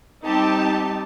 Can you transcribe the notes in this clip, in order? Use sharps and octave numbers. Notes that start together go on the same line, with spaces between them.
G3 C4 D#4 G4 A5